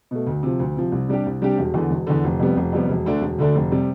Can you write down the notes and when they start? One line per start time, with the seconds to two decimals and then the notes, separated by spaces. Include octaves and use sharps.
0.11 B2 A3
0.27 D2
0.43 C3 F3
0.60 D2
0.76 C3 F3
0.92 C2
1.08 C3 G3 D4 G4
1.26 C2
1.42 C3 G3 D4 G4
1.58 E1
1.74 E2 D3
1.91 E1
2.07 E2 D3
2.24 F1
2.40 F2 C3 G3 B3
2.57 F1
2.73 F2 C3 G3 B3
2.89 E1
3.06 D2 D3 A3 D4
3.22 E1
3.39 D2 D3 A3 D4
3.55 F1
3.72 C3 G3